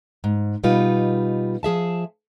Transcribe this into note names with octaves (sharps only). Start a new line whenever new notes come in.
G#2
B2 G3 D#4 F4 B4
F3 G#4 E5 A5